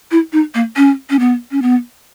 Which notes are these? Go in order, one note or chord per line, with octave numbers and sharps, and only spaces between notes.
E4
D#4
A#3
C#4
C#4
B3
C#4
B3